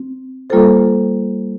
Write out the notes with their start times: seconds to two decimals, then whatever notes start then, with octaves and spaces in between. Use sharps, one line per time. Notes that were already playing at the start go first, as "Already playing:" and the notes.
Already playing: C4
0.50 G3 A#3 F4 A4 C5